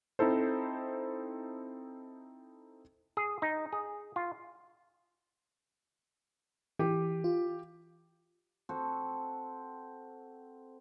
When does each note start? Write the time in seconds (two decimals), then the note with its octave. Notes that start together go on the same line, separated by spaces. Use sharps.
0.19 C4 D#4 E4 A4 C5
3.17 G#4
3.42 D#4
3.73 G#4
4.16 F4
6.79 E3 G4 G5
7.24 F4
8.69 C4 F#4 A4